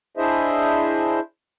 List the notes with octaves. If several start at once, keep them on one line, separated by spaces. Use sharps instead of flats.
D4 E4 G#4 C5 D#5 E5